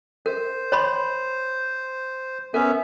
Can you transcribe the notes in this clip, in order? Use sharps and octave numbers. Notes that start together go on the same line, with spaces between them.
A#4 C5
C#5 B5 C6
B3 C#4 A#4 E5